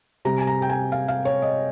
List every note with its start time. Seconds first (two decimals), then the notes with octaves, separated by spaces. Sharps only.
0.25 C3 G3 A#5
0.38 G#5
0.47 A#5
0.62 G5
0.70 G#5
0.92 F5
1.08 F5
1.25 C#5
1.42 D#5